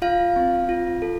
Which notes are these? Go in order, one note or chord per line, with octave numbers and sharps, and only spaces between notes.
F4 F5
C4
F4
A4